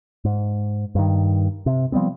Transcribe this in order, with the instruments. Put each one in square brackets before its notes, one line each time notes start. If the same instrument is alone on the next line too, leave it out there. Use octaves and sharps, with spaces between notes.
[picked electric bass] G#2
G2 D#3
C3
F3 G3 B3 C4